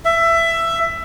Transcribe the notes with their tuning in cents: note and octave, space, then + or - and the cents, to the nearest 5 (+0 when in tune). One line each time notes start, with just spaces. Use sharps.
E5 +15